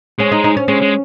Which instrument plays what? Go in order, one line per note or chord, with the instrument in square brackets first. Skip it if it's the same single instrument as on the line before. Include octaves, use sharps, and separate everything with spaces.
[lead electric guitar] G#3 [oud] C#4
[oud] D#4
D#4
C#4
[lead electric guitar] G#3 [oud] C#4
[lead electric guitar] G#3